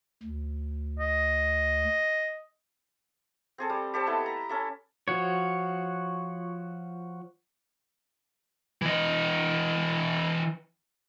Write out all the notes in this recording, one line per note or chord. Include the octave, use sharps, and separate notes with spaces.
D2
D#5
C4 G#4 A4
G3
G4 A4 C5 A5
A3 B3 E4 D#5
A#5
C#4 A4 E5
F3 F#4 C#5
E3 D#5